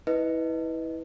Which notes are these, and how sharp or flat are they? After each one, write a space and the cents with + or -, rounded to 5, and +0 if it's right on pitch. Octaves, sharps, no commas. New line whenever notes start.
E4 -25 B4 +0 D#5 +5